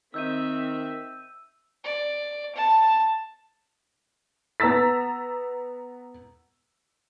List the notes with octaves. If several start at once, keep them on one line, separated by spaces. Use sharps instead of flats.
D#3 C4 E5 E6 G6 D#7
D5
A5
B3 A#5 E6 A6 B6